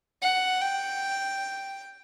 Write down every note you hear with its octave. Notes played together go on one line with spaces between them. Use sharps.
F#5
G5